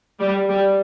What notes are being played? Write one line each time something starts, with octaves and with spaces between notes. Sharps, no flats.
G3
G3